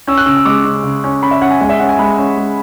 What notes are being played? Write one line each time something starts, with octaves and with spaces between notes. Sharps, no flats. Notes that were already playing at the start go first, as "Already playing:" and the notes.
C#4 E6
F#6
C#3 E6
E6
G#3 D6
C#3
C#3
C#4
C#4 B5
E5
C#4 F#5
G#5
G#3 G#5
E5
C#4 F#5
G#5
G#3 B5
C#4
G#3